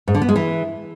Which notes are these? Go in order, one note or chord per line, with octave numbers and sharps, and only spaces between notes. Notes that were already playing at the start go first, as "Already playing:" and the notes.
G#2
D3
B3
G#3
E3